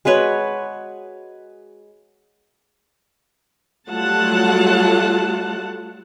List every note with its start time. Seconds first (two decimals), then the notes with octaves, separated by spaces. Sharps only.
0.05 G#3 F#4 B4 C#5
3.89 F#3 G3 A3 F4 F#5 A5